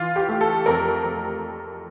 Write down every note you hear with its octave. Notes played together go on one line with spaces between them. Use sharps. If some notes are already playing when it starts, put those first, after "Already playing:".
Already playing: E3 F4
G4
A3
A4
F2 A#4
F2